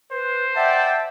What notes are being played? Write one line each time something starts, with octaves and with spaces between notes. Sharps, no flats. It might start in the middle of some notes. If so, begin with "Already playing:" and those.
B4 C5
D5 E5 F#5 G5 A5